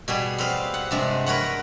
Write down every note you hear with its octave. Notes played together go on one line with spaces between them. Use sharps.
B2 G3 G#4
C4 B4 F5
F#5
G2 C3 G#3
A#4 B4 C#5 F#5